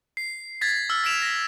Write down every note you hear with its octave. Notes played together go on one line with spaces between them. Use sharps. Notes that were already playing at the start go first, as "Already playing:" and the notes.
C7
G#6 A6 B6
E6 F6
E6 A6 B6 D7 E7 F7
A#6 B6